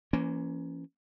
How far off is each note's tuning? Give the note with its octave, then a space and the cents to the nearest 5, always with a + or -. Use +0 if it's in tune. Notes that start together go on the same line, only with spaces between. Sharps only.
E3 +35 A#3 +0 C#4 +0